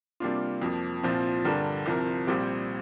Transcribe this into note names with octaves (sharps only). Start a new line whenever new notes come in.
C3 G3 A#3 D4 F4
F2 F3 A#3
C2 A#2 F3 C4 F4
G2 D3 G3 D4 A#4
C2 C3 F3 C4 A#4
A#1 A#2 G3 C4 G4